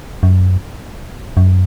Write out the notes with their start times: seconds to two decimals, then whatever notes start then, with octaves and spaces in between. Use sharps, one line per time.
0.23 F#2
1.37 F#2